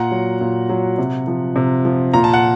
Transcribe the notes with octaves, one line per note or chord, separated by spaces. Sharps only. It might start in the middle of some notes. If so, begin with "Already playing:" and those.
Already playing: A#2 F#5 A#5
F#3
A#2
F#3
C3
F3
C3
F3
A#2 A#5
A5
F#5